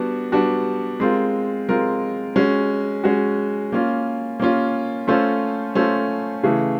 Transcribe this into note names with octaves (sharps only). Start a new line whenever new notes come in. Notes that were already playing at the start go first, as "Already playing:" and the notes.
Already playing: G3 B3 D4 F#4
G3 B3 D4 F#4
G#3 C4 F4 A#4
G#3 C4 F4 A#4
G#3 C#4 F#4
G#3 C#4 F#4
A#3 C#4 F4
A#3 C#4 F4
A3 C#4 F4 A4 C5
A3 C#4 F4 A4 C5
C#3 E3 A3